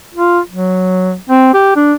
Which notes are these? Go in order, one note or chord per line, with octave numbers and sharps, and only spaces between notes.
F4
F#3
C4
G4
D4